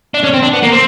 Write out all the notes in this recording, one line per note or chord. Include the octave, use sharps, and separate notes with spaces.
D4
C#4
C4
D4
B3
A#3
C4